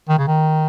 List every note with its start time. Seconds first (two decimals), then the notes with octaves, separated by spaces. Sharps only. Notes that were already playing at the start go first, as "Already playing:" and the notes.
0.09 D#3
0.18 C#3
0.28 D#3